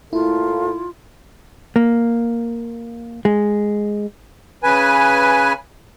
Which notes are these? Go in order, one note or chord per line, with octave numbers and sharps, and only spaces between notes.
A2 A3 A#3 E4 F4
A#3
G#3
C#3 B4 G#5